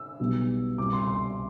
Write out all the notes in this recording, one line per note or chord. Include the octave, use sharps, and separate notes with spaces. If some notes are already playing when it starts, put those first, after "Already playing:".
Already playing: E6
B1 B2 G3 B3
C2 B2 G3 D6
C6
C6